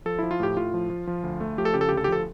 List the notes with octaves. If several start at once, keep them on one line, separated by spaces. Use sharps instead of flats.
F3 A4
F3 E4
F4
A2 G4
A2 F4
F3
F3
F3
D2
A3
F3 G4
A4
C#3 G4
A4
G4
D2
A4
G4
F3 A4